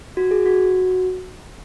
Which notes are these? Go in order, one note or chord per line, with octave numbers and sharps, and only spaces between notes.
F#4
G#4
F#4